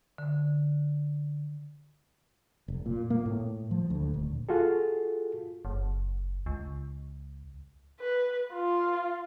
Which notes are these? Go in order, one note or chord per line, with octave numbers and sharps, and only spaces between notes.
D3
F1
A#2
A#3
A2
F3
D2
D#1
F4 F#4 G#4 A4
F#1
C#2
B4
F4